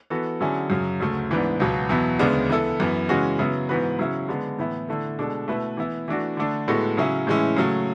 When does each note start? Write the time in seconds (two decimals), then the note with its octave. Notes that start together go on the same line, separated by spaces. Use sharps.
0.10 E3 B3 F#4 A4
0.41 D3 F#3 C#4 E4 G#4
0.70 F#2 C#3 F#3
1.00 D2 C#3 F#3 A3
1.30 G#2 E3 B3 D4
1.60 C#2 B2 F#3 B3
1.89 E2 B2 F#3 B3 E4
2.19 D2 C#3 G#3 B3 D4
2.49 E3 B3 E4 A4
2.80 F#2 E3 B3
3.09 C#3 E3 G#3 C#4 F#4
3.39 C#3 F#3 B3 E4
3.69 G#2 E3 B3 F#4 B4
3.99 C#3 F#3 C#4 E4
4.28 D3 G#3 B3
4.58 A2 E3 B3 E4
4.89 D3 A3 E4 A4
5.19 B2 G#3 D4 A4
5.48 B2 A3 E4 B4
5.77 E3 B3 E4
6.08 E3 A3 D4 F#4
6.37 D3 A3 D4
6.68 A2 G#3 B3 F#4 A4
6.97 C#3 F#3 C#4 E4
7.27 A2 E3 G#3 C#4 E4
7.56 C#3 F#3 A3